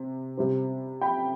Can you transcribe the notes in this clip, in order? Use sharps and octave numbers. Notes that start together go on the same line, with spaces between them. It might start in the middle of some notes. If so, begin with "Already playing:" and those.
Already playing: C3
C3 G3 C4
G5 B5